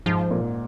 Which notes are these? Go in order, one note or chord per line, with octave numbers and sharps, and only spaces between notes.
G#2 F3
A#2